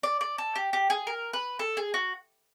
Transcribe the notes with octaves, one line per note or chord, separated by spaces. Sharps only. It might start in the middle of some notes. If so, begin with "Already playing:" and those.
D5
D5
A4
G4
G4
G#4
A#4
B4
A4
G#4
F#4